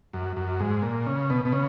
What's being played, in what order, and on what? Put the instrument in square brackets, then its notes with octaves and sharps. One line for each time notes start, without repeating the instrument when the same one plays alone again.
[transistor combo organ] F#2
F#2
G#2
A#2
C#3
B2
B2
C#3